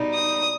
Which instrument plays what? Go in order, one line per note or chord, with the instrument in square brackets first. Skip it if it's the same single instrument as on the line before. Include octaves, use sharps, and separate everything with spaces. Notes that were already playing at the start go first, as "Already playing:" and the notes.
Already playing: [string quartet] B2 G3 D#4
[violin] D#6